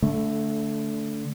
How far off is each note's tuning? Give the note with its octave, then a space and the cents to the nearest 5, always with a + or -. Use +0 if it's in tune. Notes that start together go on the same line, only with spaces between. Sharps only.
D3 -25 A3 +0